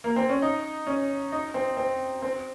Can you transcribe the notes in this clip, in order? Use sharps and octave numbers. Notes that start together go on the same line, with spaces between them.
A#3
C4
C#4
D#4
C#4
D#4
C4
C4
C4